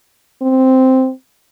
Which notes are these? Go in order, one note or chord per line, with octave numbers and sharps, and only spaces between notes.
C4